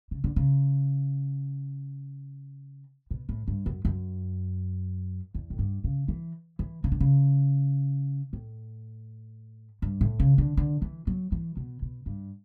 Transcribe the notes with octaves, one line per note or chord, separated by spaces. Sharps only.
C#3
D3
C#3
B2
A2
G2
F#2
F#2
E2
A2
G2
C#3
E3
E3
C#3
D3
C#3
A2
G2
A2
C#3
D3
D3
E3
F#3
E3
B2
B2
G2